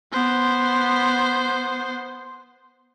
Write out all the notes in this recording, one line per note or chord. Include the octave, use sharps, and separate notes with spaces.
B3 C5